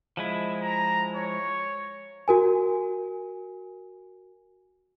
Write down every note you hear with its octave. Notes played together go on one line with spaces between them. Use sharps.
F3 G#3 E4
A#5
C#5
F#4 A#4 G#5